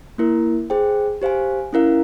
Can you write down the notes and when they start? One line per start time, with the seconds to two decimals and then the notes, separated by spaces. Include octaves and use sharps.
0.18 A#3 E4 A#4
0.70 G#4 C5 G5
1.22 G4 C5 F5 G#5
1.73 C#4 E4 A#4 F5